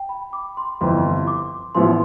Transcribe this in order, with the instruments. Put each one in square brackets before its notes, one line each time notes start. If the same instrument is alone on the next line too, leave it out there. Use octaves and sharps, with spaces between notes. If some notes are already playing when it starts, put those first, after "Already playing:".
Already playing: [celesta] G5
B5
D6
C6
[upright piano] G1 F2 E3 [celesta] C6
[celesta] D6
[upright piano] A1 A2 F3 B3 E4 [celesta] C6